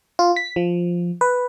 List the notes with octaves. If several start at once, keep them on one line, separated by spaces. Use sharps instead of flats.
F4
B6
F3
B4